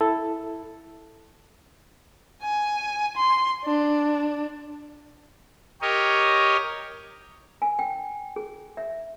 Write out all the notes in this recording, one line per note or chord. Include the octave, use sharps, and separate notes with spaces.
E4 A4
G#5
C6
D4
G4 A#4 C#5 D#5
G#5
G5
G#4
E5